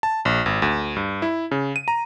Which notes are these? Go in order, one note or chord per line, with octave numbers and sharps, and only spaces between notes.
A5
A#1
G#1
D2
G2
E4
C#3
D#7
A#5